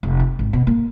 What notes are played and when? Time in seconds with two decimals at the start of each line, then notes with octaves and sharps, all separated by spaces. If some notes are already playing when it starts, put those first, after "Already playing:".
0.03 F1
0.20 C4
0.39 G#1
0.53 B2
0.67 A#3